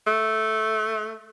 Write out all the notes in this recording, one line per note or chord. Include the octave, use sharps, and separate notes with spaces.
A3